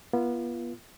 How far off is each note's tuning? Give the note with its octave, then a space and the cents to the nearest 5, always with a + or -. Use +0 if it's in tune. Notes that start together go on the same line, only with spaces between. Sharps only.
B3 -35 F4 -30